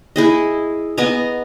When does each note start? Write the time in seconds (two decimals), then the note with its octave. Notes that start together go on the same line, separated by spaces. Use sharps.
0.16 E4 G#4 D#5
0.98 B3 D#5 G#5 A#5